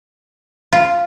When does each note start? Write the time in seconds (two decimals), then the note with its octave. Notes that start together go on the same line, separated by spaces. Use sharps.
0.73 F4